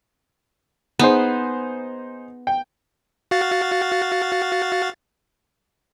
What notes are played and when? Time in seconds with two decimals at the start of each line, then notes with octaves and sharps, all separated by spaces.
0.99 B3 D#4 G#4 C5
2.47 G5
3.31 F#4 F5 A6